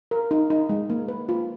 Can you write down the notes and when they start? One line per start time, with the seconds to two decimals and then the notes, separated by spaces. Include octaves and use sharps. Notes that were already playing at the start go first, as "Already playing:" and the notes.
0.11 A#4
0.31 D#4
0.50 D#4
0.69 G#3
0.90 A#3
1.08 B4
1.29 F4